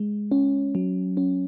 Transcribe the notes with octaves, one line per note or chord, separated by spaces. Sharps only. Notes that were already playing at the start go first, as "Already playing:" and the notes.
Already playing: G#3
C#4
F#3
C#4